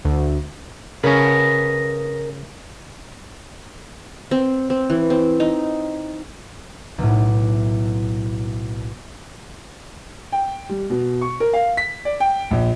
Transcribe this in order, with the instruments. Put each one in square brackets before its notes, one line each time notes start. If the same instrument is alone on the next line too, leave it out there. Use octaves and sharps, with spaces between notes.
[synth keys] D2
[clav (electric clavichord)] C#3 C#4 [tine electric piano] A#4 [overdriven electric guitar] B4 D#5
[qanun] C4
C4
E3
C4
D#4
[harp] B1 A2
[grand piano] G5
G3
B2
C#6
A#4
F5
B6
D5
G5
A#1